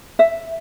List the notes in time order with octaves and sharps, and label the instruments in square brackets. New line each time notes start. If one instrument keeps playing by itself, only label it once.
[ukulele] E5